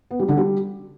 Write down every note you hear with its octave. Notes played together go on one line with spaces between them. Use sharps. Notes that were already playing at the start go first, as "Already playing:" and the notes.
B3
G3
D3
G3